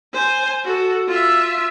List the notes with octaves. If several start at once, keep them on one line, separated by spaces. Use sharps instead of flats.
C5 G#5
F#4 A4
F4 E5